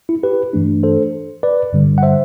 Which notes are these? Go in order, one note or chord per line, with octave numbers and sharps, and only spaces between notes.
E4
G4 B4
G2 E3 A3 D4
A4 C5
B4 D5
G2 D3 G3
F#5
C5 E5